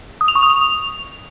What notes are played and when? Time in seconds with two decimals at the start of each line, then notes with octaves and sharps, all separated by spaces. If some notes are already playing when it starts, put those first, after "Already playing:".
0.21 D#6
0.28 F7
0.36 C#6
0.43 D#6
0.50 F7